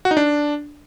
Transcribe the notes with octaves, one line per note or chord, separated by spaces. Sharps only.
F#4
D#4
D4